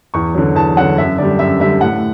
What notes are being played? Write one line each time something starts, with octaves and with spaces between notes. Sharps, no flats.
E2 C#6
D3 F#3
E2 A5
D3 F#3 F#5
F#2 E5
D3 G3 D5
F#2 E5
D3 G3 E5
A2 F#5